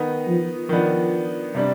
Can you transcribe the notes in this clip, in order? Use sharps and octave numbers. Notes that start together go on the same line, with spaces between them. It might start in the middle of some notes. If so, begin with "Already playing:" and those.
Already playing: D#3 B3 D#4
F3
D#3 F3 B3 D4
C3 G3 D4